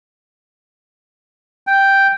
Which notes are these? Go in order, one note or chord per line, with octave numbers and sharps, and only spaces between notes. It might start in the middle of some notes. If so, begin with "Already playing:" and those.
G5